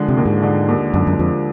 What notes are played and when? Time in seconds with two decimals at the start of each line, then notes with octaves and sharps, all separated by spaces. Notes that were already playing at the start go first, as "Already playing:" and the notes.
Already playing: D3 F3 G#3
0.09 C3
0.17 D#2
0.26 G#2
0.42 D3
0.68 D#2
0.94 F#2 D3
1.07 F#2
1.19 F2 F3